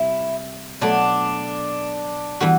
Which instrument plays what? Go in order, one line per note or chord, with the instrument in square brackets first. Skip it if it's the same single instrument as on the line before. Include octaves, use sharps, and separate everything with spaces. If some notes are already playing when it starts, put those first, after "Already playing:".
Already playing: [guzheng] C3 G3 [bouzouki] E4
[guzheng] B2 F#3 A3 [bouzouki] D4
[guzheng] E3 G3 B3 F#4